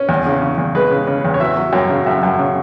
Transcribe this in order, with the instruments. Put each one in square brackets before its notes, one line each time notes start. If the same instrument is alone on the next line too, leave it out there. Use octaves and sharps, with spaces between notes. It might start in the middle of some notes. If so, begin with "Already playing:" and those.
Already playing: [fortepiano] C#4
E2
C#3
C#3
E2
G#3 B4
C#3
C#3
E2
C#5
F#3 E5
F#3
F#2 C#5
C#3
F#2 E5
F#2
C#3